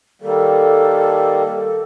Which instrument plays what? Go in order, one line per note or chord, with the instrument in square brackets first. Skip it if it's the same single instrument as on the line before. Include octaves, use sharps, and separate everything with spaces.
[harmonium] D#3 G3 A#3 [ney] A4